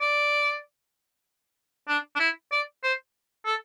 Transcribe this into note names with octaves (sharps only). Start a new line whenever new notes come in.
D5
D4
D4
E4
D5
C5
A4